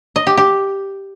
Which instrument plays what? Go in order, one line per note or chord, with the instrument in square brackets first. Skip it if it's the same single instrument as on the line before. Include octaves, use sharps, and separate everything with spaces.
[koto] D#5
G4
G4